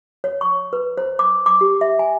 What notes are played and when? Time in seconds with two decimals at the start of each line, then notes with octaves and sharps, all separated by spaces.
0.24 C#5
0.41 C#6
0.73 B4
0.98 C5
1.19 D6
1.46 D6
1.61 G4
1.81 E5
1.99 G#5